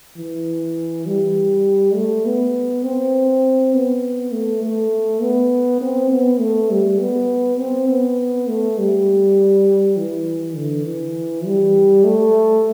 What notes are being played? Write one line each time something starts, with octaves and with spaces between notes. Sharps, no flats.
E3
G3
A3
B3
C4
B3
A3
A3
B3
C4
B3
A3
G3
B3
C4
B3
A3
G3
E3
D3
E3
G3
A3